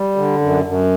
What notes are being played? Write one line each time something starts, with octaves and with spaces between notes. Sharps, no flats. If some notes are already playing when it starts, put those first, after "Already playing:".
Already playing: G3
D3
F#2
F#2